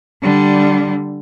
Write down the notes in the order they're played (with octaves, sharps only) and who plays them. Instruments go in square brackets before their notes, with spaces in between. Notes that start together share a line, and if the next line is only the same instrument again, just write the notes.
[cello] D3 G3